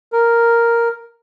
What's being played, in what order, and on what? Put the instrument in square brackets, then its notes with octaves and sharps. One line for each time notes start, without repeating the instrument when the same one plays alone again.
[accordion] A#4